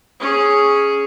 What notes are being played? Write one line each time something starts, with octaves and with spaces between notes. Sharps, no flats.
C#4 G#4